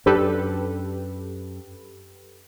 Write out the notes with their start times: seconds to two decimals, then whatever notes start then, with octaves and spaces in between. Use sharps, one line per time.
0.06 F#2 D4 G4 A4 B4